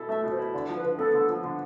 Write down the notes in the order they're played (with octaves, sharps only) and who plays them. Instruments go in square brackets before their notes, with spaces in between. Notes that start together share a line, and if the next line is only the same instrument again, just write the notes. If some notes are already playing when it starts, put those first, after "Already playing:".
Already playing: [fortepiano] B2 E4 A4
[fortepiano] A3 [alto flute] E5
[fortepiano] B2
[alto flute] C5
[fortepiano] E4
[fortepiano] D3 [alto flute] D5
[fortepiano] F3
[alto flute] B4
[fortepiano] D3
[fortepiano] B3 [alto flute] A4
[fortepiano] D3
F3
D3